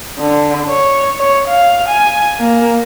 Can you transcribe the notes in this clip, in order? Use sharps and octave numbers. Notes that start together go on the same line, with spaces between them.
D3
C#5
C#5
F5
G#5
A#3